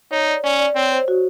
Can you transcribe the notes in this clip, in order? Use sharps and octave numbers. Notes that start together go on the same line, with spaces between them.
D#4 C#5
D5
C#4 D5
D5
C4 C#5
C5
F#4